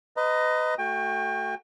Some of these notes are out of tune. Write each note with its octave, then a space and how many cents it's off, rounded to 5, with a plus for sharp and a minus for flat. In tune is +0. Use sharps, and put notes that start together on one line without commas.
B4 +35 D#5 +0 A#5 +0
A3 +0 F#4 +0 G5 +30